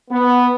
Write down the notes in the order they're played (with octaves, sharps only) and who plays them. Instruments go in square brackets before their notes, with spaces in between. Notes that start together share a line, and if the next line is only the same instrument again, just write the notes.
[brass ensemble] B3